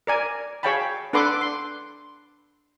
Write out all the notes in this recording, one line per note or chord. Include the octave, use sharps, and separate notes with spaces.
A#4 D5 G#5
G#4 C#5 F5 G5 A5 B5
D4 A4 B4 F#5 C6 D6
C6